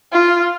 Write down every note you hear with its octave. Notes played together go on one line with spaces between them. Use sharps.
F4